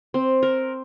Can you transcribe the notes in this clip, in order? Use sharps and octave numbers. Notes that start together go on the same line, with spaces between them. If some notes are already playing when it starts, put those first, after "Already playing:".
C4
A#4